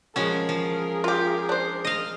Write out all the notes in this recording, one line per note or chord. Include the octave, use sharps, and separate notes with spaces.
F3 G#3 C#4 F#4 G#4 A#4
F3
F4 G4
D4 C5
D#5 F5